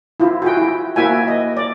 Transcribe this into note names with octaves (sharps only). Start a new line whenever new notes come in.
E4 F4
F#4 G#4 G5
E4
A#3 E4 F#4 E5 G5 G#5
D#5
D5